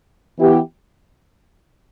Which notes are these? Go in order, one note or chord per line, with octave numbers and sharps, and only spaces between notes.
E3 B3 E4 G4